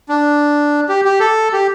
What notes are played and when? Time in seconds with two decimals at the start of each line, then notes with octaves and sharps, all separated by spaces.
0.09 D4
0.89 G4
1.05 G4
1.20 A4
1.53 G4